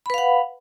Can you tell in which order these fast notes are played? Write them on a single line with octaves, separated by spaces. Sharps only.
B5 B4 F5 F#5